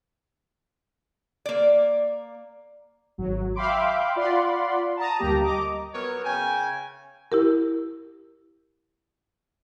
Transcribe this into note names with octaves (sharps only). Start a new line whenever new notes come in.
A#3 D5
G#1 F#3
E5 F5 G5 B5 C6 D6
F4 D5 F#5 B5 C6
A5 A#5 D#6
D2 G2 A#3 G4 A#5
D#5 A#5 D6
F#3 B3 A#4 C#5
C#3 G5 G#5
E4 G4 A#4